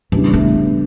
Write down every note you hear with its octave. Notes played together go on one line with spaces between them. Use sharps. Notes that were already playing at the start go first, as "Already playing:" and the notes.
C#3 E3 G3 B3 D4
A3